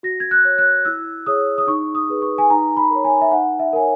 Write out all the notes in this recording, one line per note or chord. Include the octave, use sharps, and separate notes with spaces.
F#4 A#6
G#6
F#6
C#5
F#6
E4 E6
G#4 C#5 D#6
D#6
D#4 C#6
D#6
G#4 B4
C#6
G#5
D#4 A#5
B5
A#4 C#5
G#5
E5
D#4 F#5
E5
A#4 C#5 G#5